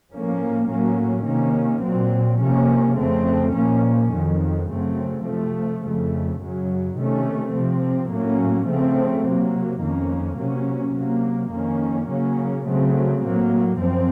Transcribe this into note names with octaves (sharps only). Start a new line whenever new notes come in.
A2 F3 A#3 C#4
A2 F#3 A#3 C#4
C3 D#3 A#3 C#4
A#2 F#3 C4
C3 F3 A#3 C#4
F2 C#3 A3 C4
A#2 F3 A#3 C#4
F2 D#3 F#3
F#2 C#3 F#3 A3 C4
C3 F3 A3
F2 C#3 A3
F#2 C#3 F#3
C3 D#3 A3 C#4
C3 F3 C4
A2 F#3 A#3 C#4
C#3 F3 A3 C4
C3 F#3 A#3
F2 D#3 A#3 C#4
C3 F#3 A#3 C#4
C3 F#3 A#3
F2 D#3 A#3 C#4
C#3 F#3 A#3 C#4
C#3 F#3 A3 C4
A2 F#3 A#3
F#2 F3 C4